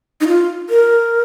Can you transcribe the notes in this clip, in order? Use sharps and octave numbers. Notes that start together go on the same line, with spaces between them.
D#4
F4
A#4